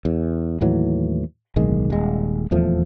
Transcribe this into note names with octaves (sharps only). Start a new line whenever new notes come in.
E2
D#2 A2 E3 F#3
D1 B1 D#3 G#3
D#1 G#3
D#1 E2 F3 A3